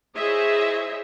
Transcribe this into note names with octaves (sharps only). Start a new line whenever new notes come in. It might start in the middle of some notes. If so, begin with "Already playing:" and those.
E4 G#4 C5 C#5 D#5 E5